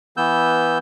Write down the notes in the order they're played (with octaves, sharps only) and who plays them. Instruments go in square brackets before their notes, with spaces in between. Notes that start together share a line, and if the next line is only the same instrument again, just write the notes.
[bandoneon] E3 B3 E6 G6